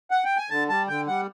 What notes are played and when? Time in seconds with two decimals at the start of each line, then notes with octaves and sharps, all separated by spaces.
0.11 F#5
0.25 G5
0.37 G#5
0.50 D3 A5
0.69 G3 A5
0.88 D3 G5
1.08 G3 F#5